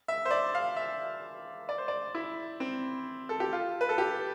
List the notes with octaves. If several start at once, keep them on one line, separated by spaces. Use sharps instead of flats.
E5
C5
D5
F5
E5
D5
C5
D5
E4
C4
A4
G4
F4
B4
A4
G4